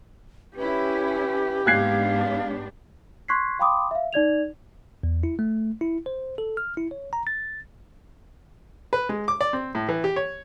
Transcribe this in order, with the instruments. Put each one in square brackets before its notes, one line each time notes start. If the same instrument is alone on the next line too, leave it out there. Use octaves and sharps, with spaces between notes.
[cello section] C#4 E4 [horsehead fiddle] G4 [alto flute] B4
[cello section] G#2 B3 D4 [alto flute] F5 [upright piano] F#6 G#6 C7
[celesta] C6 C#6 F#6 G#6 B6 C7
F5 G5 B5 C6 D6 D#6
E5 F5
D#4 D5 G#6 F7
[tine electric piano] E2
E4
A3
E4
C5
A4
F6
E4
C#5
A#5
A6
[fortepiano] B4
G#3
D6
D5
C4
A2
E3
G4
C#5